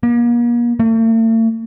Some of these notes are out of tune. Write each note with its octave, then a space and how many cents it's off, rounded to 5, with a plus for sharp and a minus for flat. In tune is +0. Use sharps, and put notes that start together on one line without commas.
A#3 +40
A3 +45